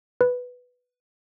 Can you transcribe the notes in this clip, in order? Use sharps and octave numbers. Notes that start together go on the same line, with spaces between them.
B4